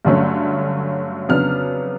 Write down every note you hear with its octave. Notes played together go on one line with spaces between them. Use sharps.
G2 D3 F#3 A3 C#4
F2 C#3 F#3 B3 D4 F6